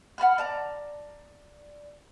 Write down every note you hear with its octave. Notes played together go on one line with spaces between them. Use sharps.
F#5 A5 B5 F6
D5 A5 A#5